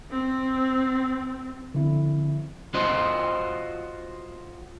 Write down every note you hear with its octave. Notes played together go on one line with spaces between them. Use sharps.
C4
D3 F3 C4 E4
F4 F#4 C5 D#5